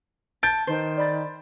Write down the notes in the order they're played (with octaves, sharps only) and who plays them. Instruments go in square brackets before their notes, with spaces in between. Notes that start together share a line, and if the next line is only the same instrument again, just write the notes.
[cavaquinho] A5 [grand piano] G6 D7
[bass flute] D#3 [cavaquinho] C5
[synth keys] D5 B5 A6